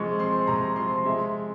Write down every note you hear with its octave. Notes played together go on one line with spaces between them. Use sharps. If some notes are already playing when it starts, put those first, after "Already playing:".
Already playing: C3 F3 G#3 C#6
C4 C6
C3 A#5
F3 C6
G#3 E5